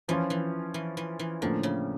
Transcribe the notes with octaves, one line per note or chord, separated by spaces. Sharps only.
E3 F3 C#4 F4
E3
E3
E3
E3
A2 D3 F3 A#3 C#4
C#3